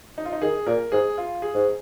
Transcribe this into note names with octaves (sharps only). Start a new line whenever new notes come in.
D#4
F4
D#4
D#3 G#4
A#2 A#4
G#2 G#4
F4
G#4
G#2